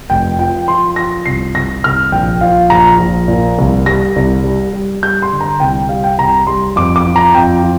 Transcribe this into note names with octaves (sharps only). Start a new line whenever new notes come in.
F1 G5
F3 G5
F3 C6
F3 A#6
C2 C7
C2 A#6
C2 F6
A#1 G5
F3 F5
A#1 A#5
A#1
A#2
C2
G3 A#6
C2
G3
G3
G3 G6
C6
D3
A#5
C2 G5
G3 F5
G5
C2 A#5
G3 C6
F2 D6
D6
F3
A#5
F2 G5
F3